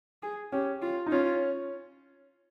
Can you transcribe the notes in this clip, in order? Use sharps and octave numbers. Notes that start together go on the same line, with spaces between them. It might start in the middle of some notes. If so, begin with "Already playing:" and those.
G#4
C#4 G4
F4
D#4
C#4 F4